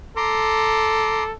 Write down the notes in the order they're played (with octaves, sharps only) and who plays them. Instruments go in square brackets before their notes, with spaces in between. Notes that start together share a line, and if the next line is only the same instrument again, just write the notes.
[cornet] A4 [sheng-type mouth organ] A#5 C6 D6